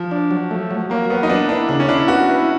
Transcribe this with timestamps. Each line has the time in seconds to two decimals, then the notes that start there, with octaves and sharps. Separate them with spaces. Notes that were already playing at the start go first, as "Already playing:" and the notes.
Already playing: F3
0.11 D4
0.31 F#3
0.51 A3
0.71 F#3
0.90 F#3 A#3
1.10 F#3 B3
1.23 D#4
1.29 B3 D4
1.49 D4 E4
1.69 C#3 D4
1.80 C#4
1.89 D4 E4
2.08 B3 F#4
2.29 E4